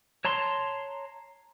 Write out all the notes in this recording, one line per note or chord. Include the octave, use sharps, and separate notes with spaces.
C#5 A5 A#5 C6